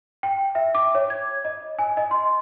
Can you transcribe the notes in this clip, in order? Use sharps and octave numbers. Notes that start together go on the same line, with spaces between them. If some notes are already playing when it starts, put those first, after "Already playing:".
G5
E5
D6
C#5
G#6
D#5
G#5
D#5
C6